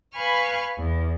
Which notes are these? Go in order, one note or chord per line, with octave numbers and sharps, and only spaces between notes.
B4 F5 G#5 B5 C#6 F6
E2